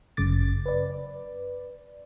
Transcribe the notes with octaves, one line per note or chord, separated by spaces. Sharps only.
G1 F#2 C#3 D6 A6
B4 D5